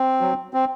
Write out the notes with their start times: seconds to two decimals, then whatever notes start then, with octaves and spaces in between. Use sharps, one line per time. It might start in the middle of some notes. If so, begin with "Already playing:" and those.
Already playing: C4
0.21 F#3
0.54 C4